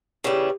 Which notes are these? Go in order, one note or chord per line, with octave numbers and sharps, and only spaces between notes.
C#3 E3 G3